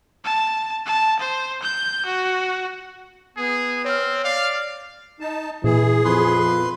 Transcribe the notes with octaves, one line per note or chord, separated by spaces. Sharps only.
A5
A5
C5
G6
F#4
B3 G#4
C4 C#5 F6
D5 F5
D#4 A5
A#2 E3 G#4
F2 B4 C6
E2 F3